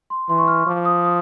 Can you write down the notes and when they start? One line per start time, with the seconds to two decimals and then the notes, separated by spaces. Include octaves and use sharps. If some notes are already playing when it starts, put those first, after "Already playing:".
0.10 C6
0.29 E3 C6
0.38 C#6
0.48 F6
0.67 F3 D6
0.85 D#6
1.05 D#6